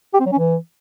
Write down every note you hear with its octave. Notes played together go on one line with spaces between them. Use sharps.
G4
C4
F#3
C#4
E3